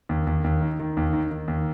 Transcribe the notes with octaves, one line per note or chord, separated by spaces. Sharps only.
D#2
D#2
D#2
D#3
D#3
D#2
D#3
D#3
D#2